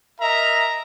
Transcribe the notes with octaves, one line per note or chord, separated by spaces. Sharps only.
A#4 D#5 E5 A#5